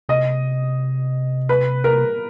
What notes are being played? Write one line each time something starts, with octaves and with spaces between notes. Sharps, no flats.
C3 D#5
B4
A#4